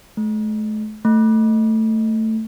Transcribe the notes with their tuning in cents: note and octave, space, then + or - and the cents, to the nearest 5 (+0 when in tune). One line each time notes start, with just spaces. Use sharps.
A3 -40
A3 +10